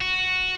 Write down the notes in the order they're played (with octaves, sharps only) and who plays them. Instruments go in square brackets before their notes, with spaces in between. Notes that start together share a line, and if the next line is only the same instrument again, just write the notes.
[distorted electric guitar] F#4